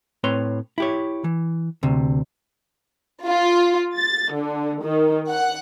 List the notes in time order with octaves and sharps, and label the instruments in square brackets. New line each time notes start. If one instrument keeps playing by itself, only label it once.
[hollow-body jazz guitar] A2 C4 B4 C#5 C6
E4 G4 C#5
E3
D2 C3
[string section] F4
A6
D3
D#3
F#5